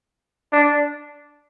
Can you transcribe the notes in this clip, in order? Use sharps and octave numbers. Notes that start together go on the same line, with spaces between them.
D4